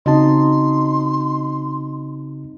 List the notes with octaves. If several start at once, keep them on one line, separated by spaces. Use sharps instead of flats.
C#3 C4 D#4 F#4 D#5 A5 C6